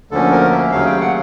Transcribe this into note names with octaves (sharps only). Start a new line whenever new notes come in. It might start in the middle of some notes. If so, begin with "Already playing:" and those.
D2 D3 F3 A#3 C#4 A4
A#4
E5
D#2 C#3 F#3 A3 F5
G5
F#5